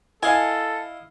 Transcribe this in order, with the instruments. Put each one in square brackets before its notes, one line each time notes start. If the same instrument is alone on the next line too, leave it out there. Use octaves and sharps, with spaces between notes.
[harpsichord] E4 D#5 F5 [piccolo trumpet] A4 [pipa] G#5